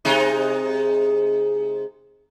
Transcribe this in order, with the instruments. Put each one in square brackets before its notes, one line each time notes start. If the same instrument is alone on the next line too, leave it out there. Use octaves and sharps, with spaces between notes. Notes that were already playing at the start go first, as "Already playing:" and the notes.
[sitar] C3 G#3 D#4